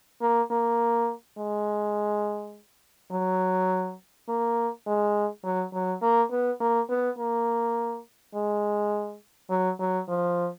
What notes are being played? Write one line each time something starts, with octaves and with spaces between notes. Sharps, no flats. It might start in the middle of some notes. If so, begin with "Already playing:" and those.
A#3
A#3
G#3
F#3
A#3
G#3
F#3
F#3
A#3
B3
A#3
B3
A#3
G#3
F#3
F#3
F3